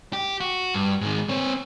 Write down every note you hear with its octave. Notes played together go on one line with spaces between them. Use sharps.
G4
F#4
G2
G#2 D#3
C4 C#5